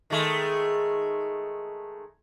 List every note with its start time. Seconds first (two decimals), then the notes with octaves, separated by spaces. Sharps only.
0.10 D#3 G#3 A3